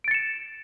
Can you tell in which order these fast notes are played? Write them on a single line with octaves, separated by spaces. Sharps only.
D7 A6 C#7 E7